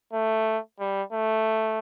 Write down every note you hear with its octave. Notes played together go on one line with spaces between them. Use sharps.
A3
G3
A3